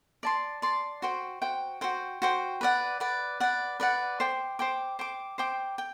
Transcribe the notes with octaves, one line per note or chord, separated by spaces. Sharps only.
D5 A5 C6
D5 A5 C6
F#4 C5 G5
F#4 C5 G5
F#4 C5 G5
F#4 C5 G5
B4 D5 F#5
B4 D5 F#5
B4 D5 F#5
B4 D5 F#5
C5 G5 D6
C5 G5 D6
C5 G5 D6
C5 G5 D6
G5